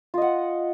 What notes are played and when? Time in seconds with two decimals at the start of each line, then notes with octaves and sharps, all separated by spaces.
0.14 F4
0.18 D#5
0.22 F#5